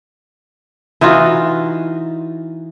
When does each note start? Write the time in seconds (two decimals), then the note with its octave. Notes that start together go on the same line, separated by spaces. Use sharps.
1.01 E3 D#4 F4 F#4